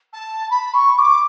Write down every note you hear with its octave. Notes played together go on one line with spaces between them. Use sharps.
A5
B5
C#6
D6